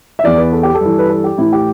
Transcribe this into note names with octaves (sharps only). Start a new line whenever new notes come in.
E5
E2 E3 D5
B4
A4
G4
A4
G2 E3
B4
A4
G4
A2 E3 E4
G4